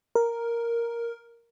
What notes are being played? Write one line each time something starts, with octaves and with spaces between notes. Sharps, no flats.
A#4